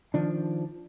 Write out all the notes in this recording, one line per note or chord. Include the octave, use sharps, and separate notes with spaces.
D#3 F3 D4